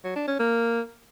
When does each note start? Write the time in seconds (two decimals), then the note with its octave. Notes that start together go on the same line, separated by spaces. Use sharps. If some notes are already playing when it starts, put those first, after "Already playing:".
0.04 F#3
0.16 D4
0.28 C#4
0.39 A#3